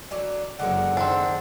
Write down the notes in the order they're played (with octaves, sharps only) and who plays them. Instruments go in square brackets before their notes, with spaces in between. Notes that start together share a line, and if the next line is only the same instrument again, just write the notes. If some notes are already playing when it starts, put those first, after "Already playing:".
[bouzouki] D3 F#3 D5
[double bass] F#1 F#3 [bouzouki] D3 G#3 A#4 [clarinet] F#5
[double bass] D#3 [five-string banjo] C4 D4